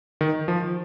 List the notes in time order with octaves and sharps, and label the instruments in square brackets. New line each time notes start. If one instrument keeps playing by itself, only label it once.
[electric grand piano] D#3
F3